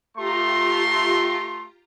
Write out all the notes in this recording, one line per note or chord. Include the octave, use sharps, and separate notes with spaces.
A3 F4 G4 A#5 C6